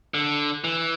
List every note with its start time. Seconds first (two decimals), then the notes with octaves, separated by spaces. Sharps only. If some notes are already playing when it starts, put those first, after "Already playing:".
0.14 D3
0.64 E3